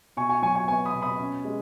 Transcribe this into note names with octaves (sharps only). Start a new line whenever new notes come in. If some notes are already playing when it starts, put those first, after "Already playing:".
B2 G#5 C#6
G#5 C#6
F#3 G#5 C#6
G#5 C#6
B3 G#5 C#6
B5 D#6
B2
B5 D#6
C#4
G#3